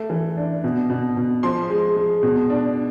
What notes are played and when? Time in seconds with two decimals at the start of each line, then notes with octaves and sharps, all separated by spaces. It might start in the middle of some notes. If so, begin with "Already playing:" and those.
Already playing: A3
0.10 E3
0.37 D4
0.64 B2
0.90 B2
1.17 B2
1.43 F3 C6
1.70 G#3
1.96 G#3
2.23 B2
2.50 D4